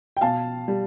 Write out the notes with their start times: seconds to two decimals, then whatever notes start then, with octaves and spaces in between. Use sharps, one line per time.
0.17 G5
0.21 B2 F5 A5
0.68 G3